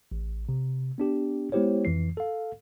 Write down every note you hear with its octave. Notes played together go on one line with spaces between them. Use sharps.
A1
C3
B3 D4 G4
G#3 B3 E4 G4 C5 C#5
F2 E3 C7
A4 F5